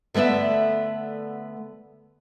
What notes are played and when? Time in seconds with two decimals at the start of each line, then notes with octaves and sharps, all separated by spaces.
0.14 D3 A3 B3 D5 E5